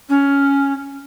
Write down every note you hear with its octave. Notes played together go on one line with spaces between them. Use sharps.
C#4